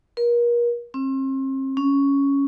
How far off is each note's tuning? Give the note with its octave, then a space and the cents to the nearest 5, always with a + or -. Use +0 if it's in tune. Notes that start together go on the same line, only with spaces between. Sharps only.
A#4 +35
C4 +40
C#4 +5